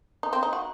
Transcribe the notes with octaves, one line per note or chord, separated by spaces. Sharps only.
D#4
C4
D#4
F#4